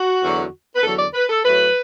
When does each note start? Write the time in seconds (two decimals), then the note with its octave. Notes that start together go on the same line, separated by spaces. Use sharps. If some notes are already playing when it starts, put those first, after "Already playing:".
Already playing: F#4
0.22 E2 D3 F#3
0.76 B4
0.83 E2 D3 F#3 A4
0.99 D5
1.14 B4
1.30 A4
1.44 A2 F#3 B4